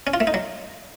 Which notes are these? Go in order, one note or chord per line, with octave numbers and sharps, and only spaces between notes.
C#4
F4
A3
D#4
F#3